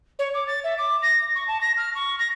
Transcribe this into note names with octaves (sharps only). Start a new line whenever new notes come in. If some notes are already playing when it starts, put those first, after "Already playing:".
C#5
D6
A6
E5
D6
A#6
C#6
A5
A#6
F6
C#6
A#6